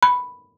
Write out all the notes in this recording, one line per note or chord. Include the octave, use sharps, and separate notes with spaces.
B5